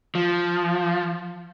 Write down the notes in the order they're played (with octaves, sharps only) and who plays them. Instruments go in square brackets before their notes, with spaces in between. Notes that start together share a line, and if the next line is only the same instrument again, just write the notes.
[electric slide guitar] F3